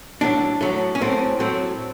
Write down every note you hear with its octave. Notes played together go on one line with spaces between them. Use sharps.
A2 F#3 A3 D4
A2 F#3 A3
C#4
A2 F#3 A3 C4
A2 F#3 A3 C4